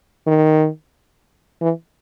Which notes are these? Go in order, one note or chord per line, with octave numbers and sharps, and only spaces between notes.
D#3
E3